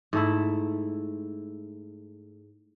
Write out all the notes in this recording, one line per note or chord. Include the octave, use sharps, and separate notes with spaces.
G#2 A3 E4